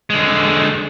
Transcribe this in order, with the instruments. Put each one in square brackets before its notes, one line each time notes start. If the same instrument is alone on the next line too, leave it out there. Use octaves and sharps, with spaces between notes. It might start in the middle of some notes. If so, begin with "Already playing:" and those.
[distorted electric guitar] D3 G#3